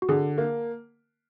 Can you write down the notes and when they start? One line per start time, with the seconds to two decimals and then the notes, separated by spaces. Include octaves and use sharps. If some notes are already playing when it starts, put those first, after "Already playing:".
0.02 F#4
0.09 D3 G#4
0.38 A#3